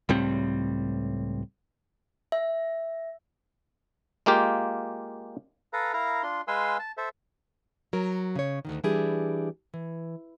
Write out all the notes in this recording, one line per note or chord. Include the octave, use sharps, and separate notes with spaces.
C#2 A2 G3 C4
E5
G#3 A#3 F4 G4
A4 B4 F5 A#5
E4 A#4 F5 A#5
D4 F4 C6
G#3 B4 F5 G#5 C6 E6
A5
A4 C5 E5
F#3 A#4
C#3 C#5
D2 G#2 D#3
E3 G3 D4 E4 G4 G#4
E3